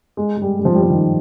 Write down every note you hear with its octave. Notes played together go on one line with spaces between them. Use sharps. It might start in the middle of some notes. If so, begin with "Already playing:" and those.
G#3
G#3
G3
G3
F3
G3
F3
D#3